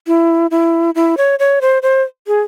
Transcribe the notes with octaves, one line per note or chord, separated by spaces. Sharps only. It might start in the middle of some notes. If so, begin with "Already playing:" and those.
E4
E4
E4
C#5
C#5
C5
C5
G#4